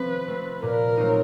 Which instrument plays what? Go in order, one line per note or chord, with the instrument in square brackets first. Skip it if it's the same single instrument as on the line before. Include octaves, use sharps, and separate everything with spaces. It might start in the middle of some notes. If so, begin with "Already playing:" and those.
Already playing: [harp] F3 A3 C4 [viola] B4
[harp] A3 C4
[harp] A#2 [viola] A#4
[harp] F#3 A3 C4 D#4